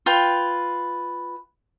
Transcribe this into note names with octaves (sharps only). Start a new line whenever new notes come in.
F4 B4 G5